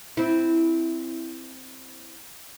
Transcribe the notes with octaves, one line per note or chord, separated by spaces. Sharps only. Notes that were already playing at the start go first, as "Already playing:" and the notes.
C4 E4